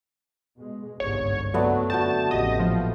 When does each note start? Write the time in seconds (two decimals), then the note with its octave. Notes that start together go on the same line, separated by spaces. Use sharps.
0.57 B2 G#3
1.00 G1 C2 G#2 C#5
1.54 F#1 D3 F#3 A3 B3 D5
1.90 D3 F#4 G5 A5
2.31 A1 F2 C#3 G4 D#5 E5
2.59 A#2 F3 F#3